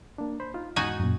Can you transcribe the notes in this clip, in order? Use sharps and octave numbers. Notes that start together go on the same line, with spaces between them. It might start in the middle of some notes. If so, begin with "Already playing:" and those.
A#3 D4
C5 B5
D#4 F4
E2 G#2 D#4 F#4 G#5
F#2 A#2